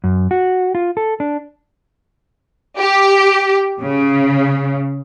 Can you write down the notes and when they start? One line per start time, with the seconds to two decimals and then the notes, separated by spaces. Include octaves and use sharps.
0.04 F#2
0.31 F#4
0.75 F4
0.97 A4
1.20 D4
2.78 G4
3.82 C#3